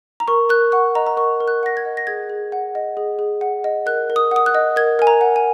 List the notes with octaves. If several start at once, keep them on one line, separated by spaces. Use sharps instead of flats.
A#5
A#4 C#6
A#4 F#6
F#5 C#6
D#5 A#5
A#5
A#4 C#6
A#4
F#6
F#5 A#6
G#6
D#5
A#6
G#4 G#6
G#4
F#5
D#5
G#4
G#4
F#5
D#5
A#4 F#6
A#4
D#6
F#5 D#6
F#6
D#5
A#4 G#6
A#4 G#5
A#5
F#5
G#5